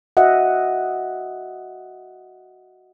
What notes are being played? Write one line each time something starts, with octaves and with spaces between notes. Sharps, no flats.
F#4 D#5 E5 F#5